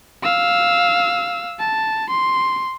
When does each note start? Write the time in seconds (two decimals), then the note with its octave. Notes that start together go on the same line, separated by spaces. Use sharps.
0.23 F5 E6
1.59 A5
2.10 C6